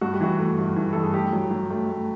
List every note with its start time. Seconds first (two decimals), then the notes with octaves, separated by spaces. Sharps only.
0.01 G2 F#4
0.13 G4
0.20 E3 F#4
0.39 A3
0.59 G2
0.76 E3
0.93 G2 A4
1.03 G#4
1.14 A3 G4
1.33 F#3
1.51 F#3
1.70 A3
1.89 A3